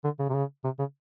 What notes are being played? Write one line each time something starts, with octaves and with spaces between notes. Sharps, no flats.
D3
C#3
C3
C#3
C3
C#3